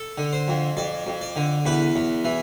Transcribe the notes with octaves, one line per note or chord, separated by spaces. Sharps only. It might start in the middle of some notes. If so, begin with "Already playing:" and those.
Already playing: A4
D3
C5
F2
F2 D5
F2
D5
D3
E2 B4
E2
E3